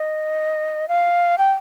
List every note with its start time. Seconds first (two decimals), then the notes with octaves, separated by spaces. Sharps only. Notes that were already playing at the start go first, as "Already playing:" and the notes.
Already playing: D#5
0.88 F5
1.38 G5